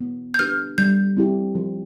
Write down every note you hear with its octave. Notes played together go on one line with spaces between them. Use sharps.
B3
G6
D4 G4 B4 F6
G3 G6
C4 E4 G4
F3